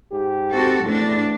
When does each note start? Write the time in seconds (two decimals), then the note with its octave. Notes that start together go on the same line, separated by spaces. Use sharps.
0.11 G#2 G4
0.53 C4 F#4 A4
0.84 E2 A2 D4 A4